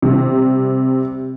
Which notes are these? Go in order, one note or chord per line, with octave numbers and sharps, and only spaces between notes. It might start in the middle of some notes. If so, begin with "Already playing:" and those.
C3 G3